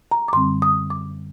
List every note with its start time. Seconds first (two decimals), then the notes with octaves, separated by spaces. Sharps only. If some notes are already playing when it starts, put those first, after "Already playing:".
0.11 A#5
0.28 D6
0.33 F#2 D3 G3 C4 C6
0.62 D#6
0.90 D6